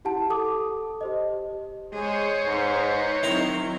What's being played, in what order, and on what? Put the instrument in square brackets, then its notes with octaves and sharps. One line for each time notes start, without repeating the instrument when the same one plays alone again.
[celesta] E4 G4 F#5 A5
A4 A5 D6 D#6
G4 C5 D#5
[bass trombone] G#3 [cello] G#4 [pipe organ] C5 C#5
[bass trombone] G#2 [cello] D#4 B4
[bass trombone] D#3 [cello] F#3 C4 [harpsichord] E4 A#5 C6